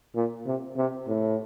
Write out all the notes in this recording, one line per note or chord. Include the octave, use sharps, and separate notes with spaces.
A#2
C3
C3
A2